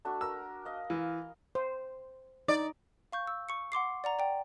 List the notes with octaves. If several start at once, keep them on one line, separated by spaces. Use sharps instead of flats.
A3 D4 F#4
A#4 E6
D#5 F5
E3 F5
C5
D#4 D5
F5 C#6 G6
E6
C#6 C#7
F#5 C6 D6 C7
D5 F#5 A#5
D5 G5